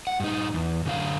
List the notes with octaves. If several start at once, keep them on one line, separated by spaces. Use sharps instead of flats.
F#5
G2 D#4
E2
F#2 D3 F5